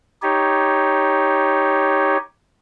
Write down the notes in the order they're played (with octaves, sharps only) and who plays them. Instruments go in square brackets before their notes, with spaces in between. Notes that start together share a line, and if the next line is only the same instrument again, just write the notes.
[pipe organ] D#4 G4 C#5